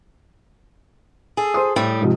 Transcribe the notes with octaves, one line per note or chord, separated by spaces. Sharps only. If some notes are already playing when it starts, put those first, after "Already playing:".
G#4 A4
C5 C6 D#6
A2 G3
G#2 C3 F3